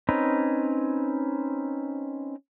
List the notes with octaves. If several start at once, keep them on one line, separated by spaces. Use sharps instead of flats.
C4 C#4 D#4 B4